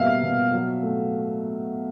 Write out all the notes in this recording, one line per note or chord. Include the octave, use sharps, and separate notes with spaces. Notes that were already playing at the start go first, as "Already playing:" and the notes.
Already playing: B2 G3 A#3 E5 F5
B2
F#3
A3